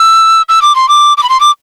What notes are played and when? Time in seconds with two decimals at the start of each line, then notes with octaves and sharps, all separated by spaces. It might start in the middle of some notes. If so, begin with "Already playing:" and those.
Already playing: E6
0.49 E6
0.62 D6
0.75 C6
0.88 D6
1.17 D6
1.23 B5
1.29 C6
1.40 D6